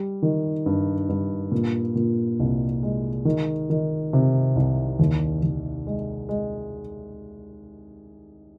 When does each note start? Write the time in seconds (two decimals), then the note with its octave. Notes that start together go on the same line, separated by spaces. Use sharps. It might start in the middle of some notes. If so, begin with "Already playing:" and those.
Already playing: G3
0.22 D#3
0.66 G2
1.09 G2
1.52 A#2
1.95 A#2
2.40 C2
2.83 G#3
3.25 D#3
3.70 D#3
4.13 C3
4.56 C2
4.99 D#2
5.43 D#2
5.87 G#3
6.29 G#3